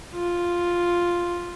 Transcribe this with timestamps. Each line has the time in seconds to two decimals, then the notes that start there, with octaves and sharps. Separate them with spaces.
0.14 F4